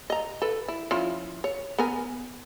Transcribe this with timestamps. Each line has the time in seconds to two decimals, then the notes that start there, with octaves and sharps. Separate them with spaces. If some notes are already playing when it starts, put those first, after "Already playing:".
0.10 D#5 A#5
0.42 A4 B4
0.68 E4
0.91 F3 C#4 E4
1.44 C#5
1.78 B3 A#4 G#5